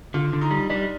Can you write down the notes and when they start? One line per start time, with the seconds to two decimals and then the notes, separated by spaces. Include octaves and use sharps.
0.14 D3 F4
0.33 D3
0.41 D#4
0.51 G3
0.70 G3 D4